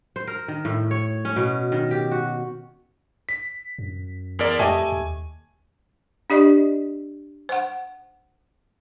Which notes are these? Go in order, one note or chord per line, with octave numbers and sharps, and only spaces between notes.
C5
A#4
D#3
A2
C#5
C#4
B2
D#3
G4
F#4
B6
F#2
E2 A#4 D5
F2 A3 G4 D#5 G#5
D#2
D4 G4 D5 D#5
C5 F#5